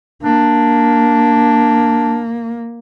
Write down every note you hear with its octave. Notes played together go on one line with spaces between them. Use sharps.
A#3 D4